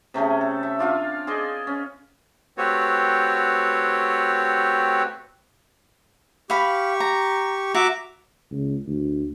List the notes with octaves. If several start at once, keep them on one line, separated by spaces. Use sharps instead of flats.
C3 A3 C#4 G#4
A4
E5
D4 F4 F5 G#5
G#4 C5 D5 D#5
C#4
A3 C4 F#4 G4 B4 C#5
G4 F5 B5 C#6
A#5
F#4 E5 A#5 D6
C#2
D2